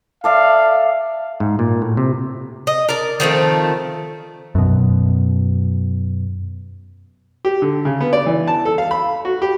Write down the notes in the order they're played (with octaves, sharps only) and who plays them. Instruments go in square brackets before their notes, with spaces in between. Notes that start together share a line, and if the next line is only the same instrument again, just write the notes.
[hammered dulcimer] A4 D5 E5 [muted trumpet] F5
[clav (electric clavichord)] G#2
A#2
A2
C3
[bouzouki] D#5
A#4 D5
D#3 F3 A3 C4
[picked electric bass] F#2 B2
[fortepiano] G4
D3
C#3
B3
D5
E3
A5
A4
F5
B5
F#4
G4